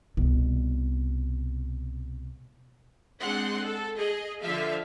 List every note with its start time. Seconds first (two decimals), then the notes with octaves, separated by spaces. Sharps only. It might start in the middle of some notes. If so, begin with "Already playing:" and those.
0.17 C2 B2
3.20 G#3 C4 D4 F#5 C6
3.61 A4
3.96 G#4 D#5
4.40 D3 F3 E5 F5